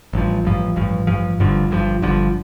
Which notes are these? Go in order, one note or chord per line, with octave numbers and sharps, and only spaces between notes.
A1 G2 F3
A1 G2 F3
A1 G2 F3
A1 G2 F3
G1 G2 D3 F3
G1 G2 D3 F3
G1 G2 D3 F3